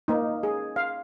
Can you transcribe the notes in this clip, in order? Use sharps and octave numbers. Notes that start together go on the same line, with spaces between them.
A#3 D#4
G#4
F5